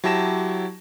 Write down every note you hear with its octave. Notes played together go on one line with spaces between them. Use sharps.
F#3 E4 G4 A5 A#6 E7